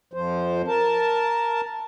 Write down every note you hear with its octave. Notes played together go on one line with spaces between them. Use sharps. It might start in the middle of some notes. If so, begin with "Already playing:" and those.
F2 F3 C5
A#4 A5